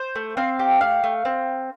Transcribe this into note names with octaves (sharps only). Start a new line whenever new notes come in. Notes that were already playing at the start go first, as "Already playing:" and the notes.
Already playing: C5
A3
C4 F5
G4
A3 F5
A3
C4